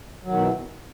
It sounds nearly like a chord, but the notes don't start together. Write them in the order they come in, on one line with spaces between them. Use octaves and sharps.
F#3 D#3 B2 E3